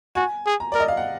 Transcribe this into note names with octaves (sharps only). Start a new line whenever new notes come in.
F#4 G#5
G#4
A#5
A#4 D5
D#5
F5
F#5